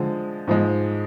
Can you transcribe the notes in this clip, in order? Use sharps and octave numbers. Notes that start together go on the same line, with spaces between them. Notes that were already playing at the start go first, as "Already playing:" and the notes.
Already playing: D3 F3 G#3
G#2 F3 G#3